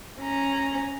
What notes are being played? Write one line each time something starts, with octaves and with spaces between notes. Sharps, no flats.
C#4 A#5